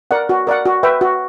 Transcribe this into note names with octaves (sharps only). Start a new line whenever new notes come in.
A#4 D5 F#5
F#4
A#4 D5 F#5
F#4
B4 E5 G5
F#4